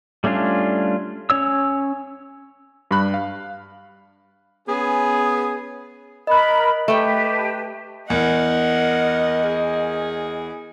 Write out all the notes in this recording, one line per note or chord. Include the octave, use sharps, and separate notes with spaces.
G3 A3 C#4 D4 F4
C#4 C#5 E6
G2 G3 B5 F#6
F5
B3 C#4 G#4
A#4 D#5 B5 F#6
A3 G4 B4 G5 A5
E2 A#4 D#5 F#5
G#4